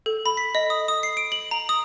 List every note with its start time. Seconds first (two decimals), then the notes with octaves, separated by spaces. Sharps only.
0.06 A4
0.26 B5
0.37 B6
0.55 D#5
0.70 D#6
0.88 D#6
1.03 C7
1.17 D7
1.32 F#7
1.51 A#5
1.69 D#6